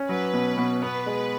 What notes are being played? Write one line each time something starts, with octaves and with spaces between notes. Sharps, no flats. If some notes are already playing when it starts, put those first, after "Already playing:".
Already playing: C#4
F#3 B4
B2
B2
B3 B4
G#3